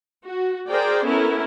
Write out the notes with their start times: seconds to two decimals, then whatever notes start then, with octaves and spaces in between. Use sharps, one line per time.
0.23 F#4
0.68 G#4 A#4 C5 D5 G5
1.05 B3 C#4 E4 A4 A#4